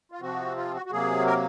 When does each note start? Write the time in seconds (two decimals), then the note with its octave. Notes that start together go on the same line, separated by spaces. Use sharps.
0.12 F4
0.21 C3 F3 C4 F#4
0.57 F4
0.74 F#4
0.86 F#4
0.92 C3 F#3 A#3 G#4
1.26 A#4